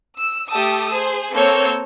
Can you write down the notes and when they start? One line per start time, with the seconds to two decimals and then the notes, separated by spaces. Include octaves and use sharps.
0.17 E6
0.49 A3 G4 A4 A5 D#6 E6
0.91 G#4 C5
1.33 A#3 C4 A4 C#5 E6 G6